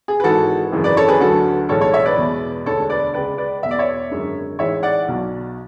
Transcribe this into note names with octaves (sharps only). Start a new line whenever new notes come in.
G#4
B4
G#1 G#2 E3 G#3 F#4 A4
G#1 F#2 C#3 E3 G#3
B4 D5
A4 C#5
G#4 B4
D2 D3 F#3 F#4 A4
B1 A2 E3 G#3 A4 C#5
A4 C#5
C#5 E5
B4 D5
E2 B2 G#3
E1 D2 D3 G#3 A4 C#5
B4 D5
C#2 C#3 G#3 B4 D5
B4 D5
E1 E2 B2 E5
D5
C#5 E5
G#1 F#2 D3 G#3
A1 G#2 E3 G#3 C#5 E5
D5 F#5
B1 B2 F#3